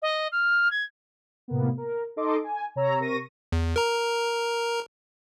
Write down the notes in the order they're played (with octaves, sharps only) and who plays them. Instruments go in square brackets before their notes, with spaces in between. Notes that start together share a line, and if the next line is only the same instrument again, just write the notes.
[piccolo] D#5
F6
G#6
[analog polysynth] A2 C3 A#3 B3
A#4
D#4 A4 D#5 C6 D6
G#5
C3 C#5 A#5 E6
C3 A#4 C#6 A#6 D#7
[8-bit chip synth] E2
A#4 A#5